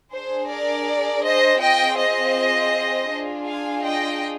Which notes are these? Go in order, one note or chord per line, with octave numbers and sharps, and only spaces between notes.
D4 G#4 C5
A#4 D5
C5 D#5
C4 F4 G#4 D#5 G5
C5 D#5
D4 F4 G#4
F5 G#5
D#5 G5